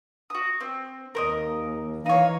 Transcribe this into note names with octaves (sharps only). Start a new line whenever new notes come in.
F#4 D#6
C4
D#2 A#4 C5 D#5
E3 D#4 C#5 F5